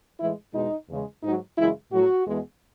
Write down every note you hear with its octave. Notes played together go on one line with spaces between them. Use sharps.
A2 E3 G#3 E4
E2 B2 G#3 D#4
E2 C#3 G#3
G#2 F#3 D#4
F#2 C#3 E3 G#3 E4
A2 F#3 F#4
E2 B2 G#3